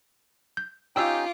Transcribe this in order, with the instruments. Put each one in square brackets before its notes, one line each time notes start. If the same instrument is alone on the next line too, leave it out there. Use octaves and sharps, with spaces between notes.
[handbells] G6
[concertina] C#4 D#4 G4 [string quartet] F4 D6 [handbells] G5 E6